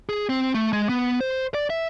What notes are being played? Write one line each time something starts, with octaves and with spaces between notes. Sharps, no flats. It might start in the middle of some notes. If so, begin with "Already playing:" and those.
G#4
C4
A3
G#3
B3
C5
D5
E5